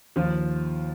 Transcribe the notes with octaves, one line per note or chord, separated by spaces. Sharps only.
D#2 F3 F4